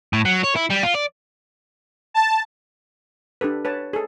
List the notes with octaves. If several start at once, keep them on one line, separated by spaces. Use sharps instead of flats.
A2
F#3
C#5
E4
G3
F4
D5
A5
D4 G4 A4 B4
B4 C#5 A5
G#4 A4